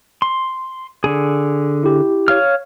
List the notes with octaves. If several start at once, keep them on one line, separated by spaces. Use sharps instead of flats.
C6
D3 G#4
E4 G4
C#5 F5 F6